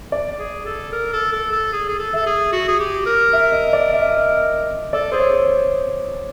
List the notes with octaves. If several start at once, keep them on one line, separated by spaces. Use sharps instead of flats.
D5
G#4
A4
A#4
A4
A4
A4
G#4
G#4
A4
A4 E5
G#4
F#4
G#4
G4
A#4
E5
D#5
D5
E5
D#5
E5
A4 D5
G#4 C5
C#5